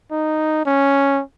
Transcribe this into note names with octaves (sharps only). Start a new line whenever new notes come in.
D#4
C#4